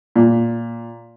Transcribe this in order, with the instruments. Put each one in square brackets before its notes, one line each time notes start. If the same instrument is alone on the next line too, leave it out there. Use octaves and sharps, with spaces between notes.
[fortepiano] A#2